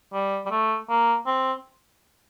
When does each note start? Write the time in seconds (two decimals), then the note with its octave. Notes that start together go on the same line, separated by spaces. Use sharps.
0.13 G3
0.46 G3
0.51 A3
0.89 A#3
1.26 C4